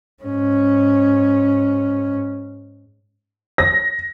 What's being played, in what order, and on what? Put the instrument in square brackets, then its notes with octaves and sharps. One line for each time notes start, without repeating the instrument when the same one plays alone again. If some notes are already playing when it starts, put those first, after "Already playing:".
[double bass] G#2 C#4
[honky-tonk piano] A#6